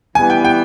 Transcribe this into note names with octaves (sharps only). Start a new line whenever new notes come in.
E3 G3 B3 G#5
G5
G5